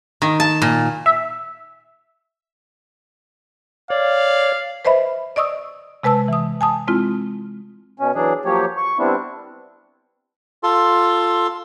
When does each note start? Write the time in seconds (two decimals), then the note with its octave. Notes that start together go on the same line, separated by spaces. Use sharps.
0.22 D#3
0.40 A5
0.62 A#2
1.06 E5
3.90 C#5 D5 F5
4.85 B4 C5 D#5 E5 B5
5.36 D5 D#5 C#6 D#6 E6
6.03 C3 G#3 B4 A5 E6
6.28 E3 D#6
6.61 G#5 A5 D#6
6.88 G#3 C4 E4 F4
8.00 B2 C#4
8.15 E3 F#3 D4 G#4
8.45 F3 F#3 A#3 G4 C#5
8.77 C#6
8.99 G3 B3 C4 D4 E4
10.63 F4 A4 C6